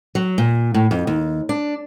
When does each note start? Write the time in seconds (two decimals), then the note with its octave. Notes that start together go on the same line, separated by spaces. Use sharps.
0.15 F#3
0.38 A#2
0.74 A2
0.91 F2
1.07 D#2
1.49 D4